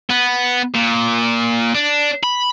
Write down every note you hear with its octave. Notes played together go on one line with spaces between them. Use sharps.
B3
A#2
D4
B5